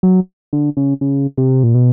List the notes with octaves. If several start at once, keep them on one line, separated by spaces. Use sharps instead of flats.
F#3
D3
C#3
C#3
C3
A#2
B2